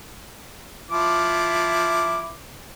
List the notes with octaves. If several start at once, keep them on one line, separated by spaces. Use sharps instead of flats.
F3 E4 D6